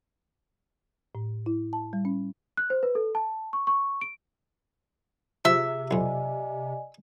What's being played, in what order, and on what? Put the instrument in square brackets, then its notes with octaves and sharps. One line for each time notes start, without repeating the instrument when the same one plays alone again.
[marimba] A2
E4
A5
G3
C#4
[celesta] F#6
C5
B4
A4
A5
C#6
C#6
D7
[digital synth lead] C3 [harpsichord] F3 [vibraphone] G#4 [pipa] E5
[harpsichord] B1 F2 [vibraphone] D5 D#5 G#5